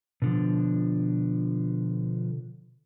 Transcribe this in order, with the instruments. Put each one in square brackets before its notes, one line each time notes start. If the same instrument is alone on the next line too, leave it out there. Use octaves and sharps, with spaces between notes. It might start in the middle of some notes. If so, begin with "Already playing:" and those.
[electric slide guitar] B2 D3 F3